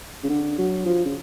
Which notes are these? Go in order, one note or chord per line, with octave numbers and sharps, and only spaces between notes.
C#3
D3
F#3
F3
C#3